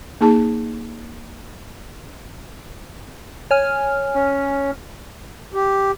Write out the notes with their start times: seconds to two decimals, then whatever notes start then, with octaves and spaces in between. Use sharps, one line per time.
0.21 A#3 D#4 G#4 A5
3.51 C#5 G#5 F6
4.15 C#4
5.54 G4